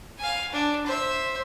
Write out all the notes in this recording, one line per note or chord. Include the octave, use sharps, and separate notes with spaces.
F5 G#5
D4
C5 E5